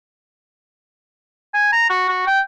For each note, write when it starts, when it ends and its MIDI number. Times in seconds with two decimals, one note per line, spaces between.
1.54 1.70 80
1.72 1.85 82
1.90 2.04 66
2.09 2.23 66
2.27 2.40 79